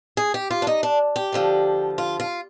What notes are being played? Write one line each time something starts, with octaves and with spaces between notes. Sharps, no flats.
G#4
G4
F4
D4
D#4
D4
G4
D2 D3 F3
F4
F4